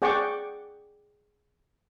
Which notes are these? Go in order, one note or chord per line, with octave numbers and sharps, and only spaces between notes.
G#4 D5 F#5 G5 C#6 D6